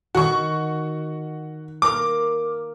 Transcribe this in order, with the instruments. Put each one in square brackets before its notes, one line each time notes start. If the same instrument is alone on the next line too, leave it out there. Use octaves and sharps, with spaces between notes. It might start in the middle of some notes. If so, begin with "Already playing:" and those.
[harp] D#3 [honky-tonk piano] F#4 C#6
[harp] A#3 A#4 [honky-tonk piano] D6